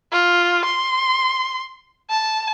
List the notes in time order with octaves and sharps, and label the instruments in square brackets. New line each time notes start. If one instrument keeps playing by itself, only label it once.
[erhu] F4
C6
A5